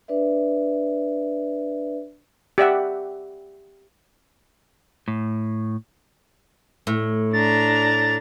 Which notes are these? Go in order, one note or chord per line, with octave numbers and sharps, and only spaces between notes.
D4 B4 D5 E5
G4 D5 E5 F#5
A2
A2
D4 A#5 A6